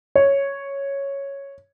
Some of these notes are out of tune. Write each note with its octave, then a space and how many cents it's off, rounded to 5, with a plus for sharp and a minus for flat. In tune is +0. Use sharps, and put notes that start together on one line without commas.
C#5 +0